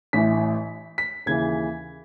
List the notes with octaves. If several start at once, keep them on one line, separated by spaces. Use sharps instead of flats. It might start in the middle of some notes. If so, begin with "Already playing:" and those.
A1 A2 E3 B6
B6
D#2 C#3 E3 G#6